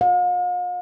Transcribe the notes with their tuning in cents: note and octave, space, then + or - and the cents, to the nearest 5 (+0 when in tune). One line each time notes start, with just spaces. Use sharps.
F5 +45